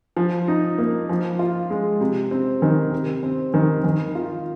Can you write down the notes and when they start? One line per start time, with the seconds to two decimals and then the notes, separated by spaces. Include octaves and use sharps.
0.17 F3
0.48 D#4
0.78 A#3
1.09 F3
1.39 F4
1.70 G#3
2.01 C3
2.31 C4
2.62 D#3
2.92 C3
3.23 C4
3.54 D#3
3.84 D#3
4.15 F4